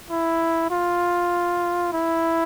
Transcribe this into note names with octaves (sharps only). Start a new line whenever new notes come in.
E4
F4
E4